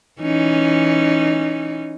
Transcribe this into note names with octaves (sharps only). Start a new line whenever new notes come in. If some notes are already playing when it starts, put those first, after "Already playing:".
E3 C#4 D#4